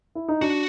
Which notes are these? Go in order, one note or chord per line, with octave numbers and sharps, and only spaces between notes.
E4
D#4
D4 F#4